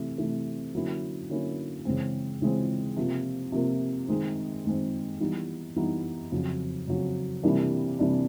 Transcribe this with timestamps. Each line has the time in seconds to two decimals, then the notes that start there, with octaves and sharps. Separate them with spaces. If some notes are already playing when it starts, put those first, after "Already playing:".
Already playing: C3 E3 A3
0.18 C3 E3 A3
0.74 D3 F#3 A#3 C#4 E4
1.29 D3 F#3 A#3 C#4 E4
1.85 C#3 E3 G#3 C4
2.41 C#3 E3 G#3 C4
2.97 C3 F3 A#3
3.52 C3 F3 A#3
4.08 D#3 G#3 C4
4.64 D#3 G#3 C4
5.20 E3 G3 B3 D#4
5.76 E3 G3 B3 D#4
6.32 F2 C#3 F#3
6.88 F2 C#3 F#3
7.43 C3 E3 G3 A#3 D4
7.99 C3 E3 G3 A#3 D4